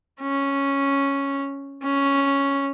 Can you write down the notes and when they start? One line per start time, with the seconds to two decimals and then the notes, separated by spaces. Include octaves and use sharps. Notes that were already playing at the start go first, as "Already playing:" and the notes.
0.21 C#4
1.83 C#4